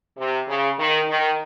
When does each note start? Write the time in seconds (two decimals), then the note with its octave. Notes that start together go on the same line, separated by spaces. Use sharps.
0.17 C3
0.47 C#3
0.78 D#3
1.08 D#3